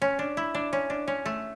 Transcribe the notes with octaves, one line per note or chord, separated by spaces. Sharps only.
C#4
D4
E4
D4
C#4
D4
C#4
A3